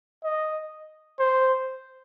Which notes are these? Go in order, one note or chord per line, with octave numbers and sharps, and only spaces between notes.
D#5
C5